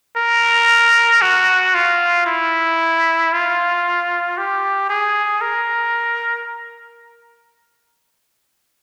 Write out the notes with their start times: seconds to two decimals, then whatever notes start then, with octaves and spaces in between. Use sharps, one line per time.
0.16 A#4
1.22 F#4
1.75 F4
2.26 E4
3.32 F4
4.37 G4
4.90 G#4
5.41 A#4